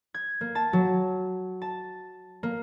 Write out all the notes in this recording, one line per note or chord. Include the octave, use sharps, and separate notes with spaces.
G#6
A#3
A5
F#3
A5
A#3